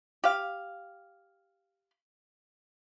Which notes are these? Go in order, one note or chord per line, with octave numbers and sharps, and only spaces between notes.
G4 F5